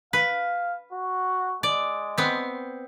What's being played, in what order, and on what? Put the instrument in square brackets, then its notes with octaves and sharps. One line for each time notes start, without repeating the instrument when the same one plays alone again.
[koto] B4 [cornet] F5
[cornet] F#4
[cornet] G#3 [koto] D5
[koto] B3 C4